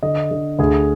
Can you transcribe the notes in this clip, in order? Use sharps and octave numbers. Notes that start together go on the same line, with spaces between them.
D3 D#5
D3
D2 G#4